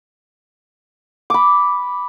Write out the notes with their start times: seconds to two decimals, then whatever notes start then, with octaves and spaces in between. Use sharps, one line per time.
1.30 B5 D6